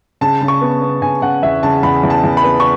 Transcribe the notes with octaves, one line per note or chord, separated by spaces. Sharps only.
C#3 A5
C#3
C#6
B3
B3
C#3 G#5
C#3 F#5
E2 E5
C#3 A5
E2 B5
E2
A5
E2
B5
B3
C#6